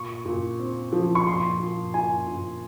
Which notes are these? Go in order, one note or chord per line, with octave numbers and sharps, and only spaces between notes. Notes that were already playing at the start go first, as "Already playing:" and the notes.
Already playing: A#2 C#6
A#2
C4
F3
C#6
A#2 C6
A#2
A#2 G#5
A#2